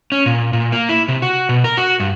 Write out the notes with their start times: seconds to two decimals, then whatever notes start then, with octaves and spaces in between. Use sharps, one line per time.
0.12 C#4
0.26 A#2
0.53 A#2
0.72 A#3
0.89 E4
1.08 C3
1.22 F#4
1.49 B2
1.64 A#4
1.77 F#4
2.00 G2